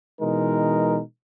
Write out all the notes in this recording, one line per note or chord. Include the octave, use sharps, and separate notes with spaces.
B2 E3 G#3 D#4 A#4